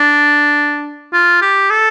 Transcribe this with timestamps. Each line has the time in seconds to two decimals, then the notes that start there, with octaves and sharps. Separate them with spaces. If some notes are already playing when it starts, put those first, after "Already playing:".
Already playing: D4
1.13 F4
1.42 G4
1.70 A4